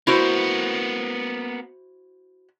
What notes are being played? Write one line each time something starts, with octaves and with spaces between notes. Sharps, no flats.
A#3 B3 E4 F#4 C5